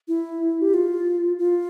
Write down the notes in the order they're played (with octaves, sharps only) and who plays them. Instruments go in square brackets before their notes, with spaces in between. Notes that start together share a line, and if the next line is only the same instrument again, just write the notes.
[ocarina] E4
G4
F4
F4